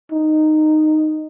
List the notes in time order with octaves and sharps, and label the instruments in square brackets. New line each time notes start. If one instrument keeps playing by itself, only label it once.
[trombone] D#4